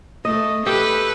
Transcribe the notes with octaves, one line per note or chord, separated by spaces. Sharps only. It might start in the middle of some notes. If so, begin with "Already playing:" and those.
A3 D#5
G4 A4 B4